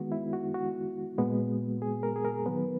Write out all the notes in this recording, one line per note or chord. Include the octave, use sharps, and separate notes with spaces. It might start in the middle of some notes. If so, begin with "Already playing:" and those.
Already playing: D#3 G#3 B3 F#4
E4
F#4
F#4
A#2 G#3 B3
G#4
A#4
G#4
A#4
D#3 F#3 B3 B4